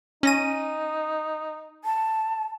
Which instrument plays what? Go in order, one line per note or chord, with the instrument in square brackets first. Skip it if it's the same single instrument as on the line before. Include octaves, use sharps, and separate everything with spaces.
[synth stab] C#4 A#6 D#7 [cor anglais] D#4
[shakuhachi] A5